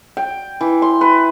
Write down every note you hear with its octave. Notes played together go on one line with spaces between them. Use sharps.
G5
E3
C6
B4